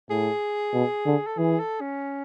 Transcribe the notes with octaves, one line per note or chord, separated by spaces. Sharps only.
A2 G#4
B2
D3
A4
E3 G#4
A4
C#4